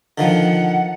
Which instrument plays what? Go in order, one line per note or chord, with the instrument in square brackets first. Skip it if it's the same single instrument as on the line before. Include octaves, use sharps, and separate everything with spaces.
[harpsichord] D3 D#3 F3 [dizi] F#5